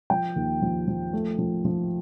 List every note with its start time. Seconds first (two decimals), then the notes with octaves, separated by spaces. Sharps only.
0.10 F3 G5
0.36 D#2
0.62 F3
0.88 F3
1.13 A3
1.39 F3
1.65 F3